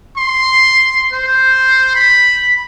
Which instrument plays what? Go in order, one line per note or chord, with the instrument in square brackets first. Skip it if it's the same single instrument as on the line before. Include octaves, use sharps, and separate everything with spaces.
[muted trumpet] C6
C5
B5